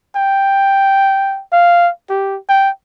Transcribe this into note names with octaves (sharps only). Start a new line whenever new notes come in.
G5
F5
G4
G5